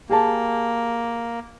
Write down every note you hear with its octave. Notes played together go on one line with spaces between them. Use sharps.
A#3 G4 G#4 A5